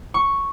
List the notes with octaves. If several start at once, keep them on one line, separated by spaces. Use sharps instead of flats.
C#6